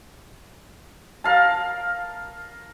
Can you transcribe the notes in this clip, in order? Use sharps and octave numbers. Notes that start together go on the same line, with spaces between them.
A#4 F5 A5